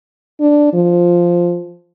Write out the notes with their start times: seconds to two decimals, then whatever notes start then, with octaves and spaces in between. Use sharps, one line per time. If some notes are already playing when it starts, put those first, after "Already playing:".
0.40 D4
0.73 F3